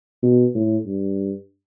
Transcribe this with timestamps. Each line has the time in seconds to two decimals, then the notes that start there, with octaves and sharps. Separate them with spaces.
0.23 B2
0.55 A2
0.86 G2